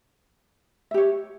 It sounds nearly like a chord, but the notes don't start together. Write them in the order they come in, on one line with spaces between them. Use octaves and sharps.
E5 G4 C#5